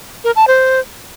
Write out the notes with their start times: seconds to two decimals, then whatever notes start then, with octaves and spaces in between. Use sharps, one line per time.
0.24 A#4
0.36 A5
0.48 C5